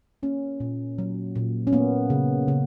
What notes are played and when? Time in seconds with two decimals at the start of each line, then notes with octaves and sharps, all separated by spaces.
0.23 A#3 C#4
0.60 A#2
0.98 F#3
1.36 A#2
1.67 C#4
1.73 A#3 B3
2.10 C#3
2.48 C#3